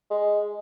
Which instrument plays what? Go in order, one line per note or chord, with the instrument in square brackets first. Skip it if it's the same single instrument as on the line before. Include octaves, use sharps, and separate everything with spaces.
[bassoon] G#3